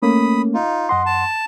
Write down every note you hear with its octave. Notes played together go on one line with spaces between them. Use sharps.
A3 A#3 C#4 B5 D#6
D#4 F4
F#2 D#5 F#5 C6
A5